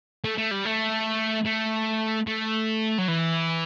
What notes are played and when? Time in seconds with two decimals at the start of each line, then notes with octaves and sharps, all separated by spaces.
0.24 A3
0.37 A3
0.51 G3
0.65 A3
1.46 A3
2.27 A3
2.98 F#3
3.08 E3